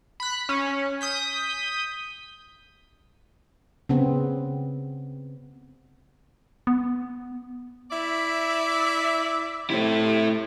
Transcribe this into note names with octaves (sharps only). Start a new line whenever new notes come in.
B5 F#6
C#4
D#6 G6 B6
C#3 B3 C4
B3
E4 D5 E5
C3 A3 E4